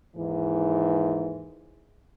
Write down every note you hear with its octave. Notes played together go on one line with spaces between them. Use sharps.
D#2 G#2 E3